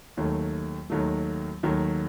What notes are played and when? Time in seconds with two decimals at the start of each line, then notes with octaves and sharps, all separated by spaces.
0.17 D#2 D#3 F#3 A3
0.90 D#2 D#3 F#3 A3
1.63 D#2 D#3 F#3 A3